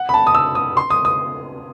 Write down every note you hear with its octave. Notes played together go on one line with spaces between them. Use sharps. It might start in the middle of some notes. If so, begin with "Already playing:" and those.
Already playing: F#5
B5
A5
D#6
E6
D#6
C6
D#6
D#6